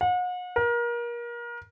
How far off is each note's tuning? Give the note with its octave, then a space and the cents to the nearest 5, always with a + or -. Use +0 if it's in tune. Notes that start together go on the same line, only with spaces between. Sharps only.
F#5 -40
A#4 +30